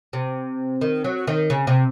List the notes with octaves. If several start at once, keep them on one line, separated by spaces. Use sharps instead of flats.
C3
D#3
F#3
D#3
C#3
C3